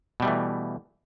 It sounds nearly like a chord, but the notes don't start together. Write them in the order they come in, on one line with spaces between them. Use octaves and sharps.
B2 G3 A3 E3